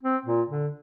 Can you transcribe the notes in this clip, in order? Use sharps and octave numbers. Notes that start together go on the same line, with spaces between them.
C4
A#2
D3